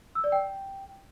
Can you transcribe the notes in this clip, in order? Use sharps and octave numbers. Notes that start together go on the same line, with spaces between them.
E6
D5
G5